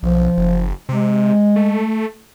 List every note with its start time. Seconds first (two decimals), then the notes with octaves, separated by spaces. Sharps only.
0.03 B1 F3
0.38 F#1
0.89 C3 G#3
1.56 A3